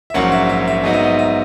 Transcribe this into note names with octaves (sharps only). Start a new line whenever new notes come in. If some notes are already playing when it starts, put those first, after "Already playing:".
E5
A#1 G#2 F#3 A#3 C#4 F#5
E5
E5
E5
G#2 F#3 B3 D#4 D#5
E5
D#5
E5